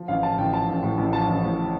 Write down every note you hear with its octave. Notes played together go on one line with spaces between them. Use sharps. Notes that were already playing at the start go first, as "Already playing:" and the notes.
Already playing: F3
A1 F5
A2 A5
A1 G5
F3 A5
A1
A2
A1
F3 A5
A1
A2